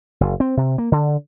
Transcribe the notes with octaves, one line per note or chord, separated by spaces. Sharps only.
F#1
C4
C3
A#3
D3